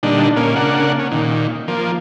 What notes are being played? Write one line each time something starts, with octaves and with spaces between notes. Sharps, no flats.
A#2 D3 G3 D4 D#4
A#2 A#3 C#4
C#3 A#3 D4 F#5
C#4
A#2 D#3
F3 A#3